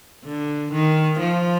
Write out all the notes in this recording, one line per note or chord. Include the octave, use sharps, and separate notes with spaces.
D3
D#3
F3